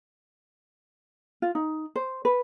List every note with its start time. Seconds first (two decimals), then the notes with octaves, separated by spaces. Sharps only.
1.42 F4
1.55 D#4
1.96 C5
2.25 B4